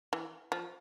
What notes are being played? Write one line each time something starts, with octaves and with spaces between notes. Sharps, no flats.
E3
F3